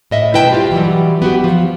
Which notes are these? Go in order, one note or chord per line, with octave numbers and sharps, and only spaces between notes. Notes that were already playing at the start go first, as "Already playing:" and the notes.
A2 D#5 E5
B2 E4 B4 G5 A5
G3 F4 G4
E3 F#3 G3
B3 F#4 G4
F3